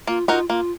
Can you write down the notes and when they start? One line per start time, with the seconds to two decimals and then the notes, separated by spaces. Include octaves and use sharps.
0.07 A#3 F4
0.28 D#4 F4 F#4 A#4
0.49 A#3 F4